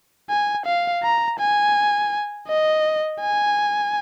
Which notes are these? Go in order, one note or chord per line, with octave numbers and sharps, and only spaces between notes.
G#5
F5
A#5
G#5
D#5
G#5